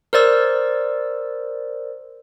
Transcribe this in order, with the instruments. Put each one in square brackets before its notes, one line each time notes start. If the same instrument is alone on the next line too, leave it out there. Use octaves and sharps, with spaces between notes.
[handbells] A#4 C5 D5 E6